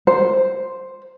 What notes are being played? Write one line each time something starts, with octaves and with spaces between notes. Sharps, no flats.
C5